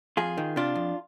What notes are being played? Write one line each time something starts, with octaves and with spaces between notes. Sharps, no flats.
F2 F4 G#4
D#3
C3 D4 F4
F2